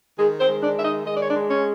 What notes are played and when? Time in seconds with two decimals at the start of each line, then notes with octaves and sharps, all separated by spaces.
0.18 D#3 G#3 G#4
0.40 C4 C5
0.48 G#3
0.62 D4 D5
0.77 D#3 E5
0.84 D#4 D#5
1.06 G#3 D#5
1.14 D5
1.22 C#5
1.30 D4 D5
1.36 G#3
1.50 C#4 C#5